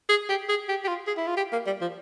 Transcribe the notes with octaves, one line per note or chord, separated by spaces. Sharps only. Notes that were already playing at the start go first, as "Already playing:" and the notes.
G#4
G4
G#4
G4
G4
F4
G#4
E4
F4
G4
A#3
G3
F3